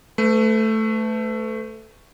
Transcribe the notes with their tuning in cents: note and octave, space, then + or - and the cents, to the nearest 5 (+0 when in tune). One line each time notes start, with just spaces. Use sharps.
A3 +0 B4 +35